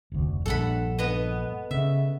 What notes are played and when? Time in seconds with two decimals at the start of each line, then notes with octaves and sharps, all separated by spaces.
0.12 F1 D2
0.46 A#1 G2 A4 F#5 B5
0.99 B3 B4 D#5
1.71 C#3 E5